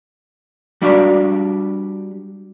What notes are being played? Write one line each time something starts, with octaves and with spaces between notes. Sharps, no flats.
G3 D4 F#4 D5 F5